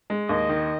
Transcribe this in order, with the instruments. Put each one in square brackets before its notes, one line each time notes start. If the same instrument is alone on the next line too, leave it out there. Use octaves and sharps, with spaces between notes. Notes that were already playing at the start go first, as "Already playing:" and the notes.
[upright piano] G#3
[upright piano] D#2 [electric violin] D#5
[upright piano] D#3